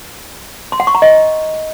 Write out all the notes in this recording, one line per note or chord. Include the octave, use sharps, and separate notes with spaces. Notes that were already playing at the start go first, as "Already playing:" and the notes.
C6
F#5
C#6
A#5
D#5